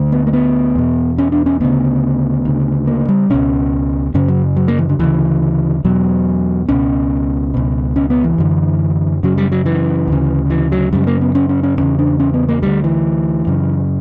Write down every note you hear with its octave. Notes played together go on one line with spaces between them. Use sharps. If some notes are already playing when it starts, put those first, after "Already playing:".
Already playing: D2 D3
B3
A#3
B3
E2 B2
C#4
D4
C#4
D2 C#3 B3
D2 C#3
A#3
G3
C#2 B2 C#4
F#2 C#3 C#4
F#3
F#3
A#3
E3
D3
D2 C#3 E3
E2 B2 F#3
C#2 B2 C#4
C#2 B2
C#4
B3
E3
F#2 D3
F#2 C#3 F#3
G3
F#3
E3
D2 C#3
E3
F#3
F#2 C#3 G3
A#3
B3
C#4
C#4
C#4
E2 C#3 C#4
D4
C#4
B3
A#3
D2 D3 G3
E3
F#2 C#3